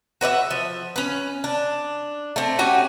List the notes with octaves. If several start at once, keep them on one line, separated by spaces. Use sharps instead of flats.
F#4 B4 D5 E5
F3
C#4 B4
D4
A3 C4
C#4 F#4 G4 G#5